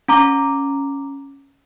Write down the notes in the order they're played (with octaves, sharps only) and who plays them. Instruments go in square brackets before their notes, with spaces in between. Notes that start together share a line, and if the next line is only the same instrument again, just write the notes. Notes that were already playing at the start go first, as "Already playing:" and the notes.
[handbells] C#4 A#5 D6